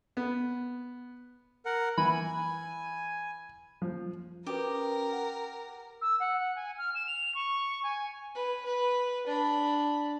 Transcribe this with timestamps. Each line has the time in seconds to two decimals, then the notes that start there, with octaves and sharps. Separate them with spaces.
0.17 B3
1.66 A#4 F#5
1.98 E3 G#5 B5
3.82 F3
4.46 C#4 F#4 G4 A#4 B4
5.13 F#5
6.01 E6
6.19 F#5
6.55 G#5
6.77 F6
6.94 E7
7.06 F7
7.34 C#6
7.83 G#5
8.35 B4
8.65 B4
9.27 D4 B5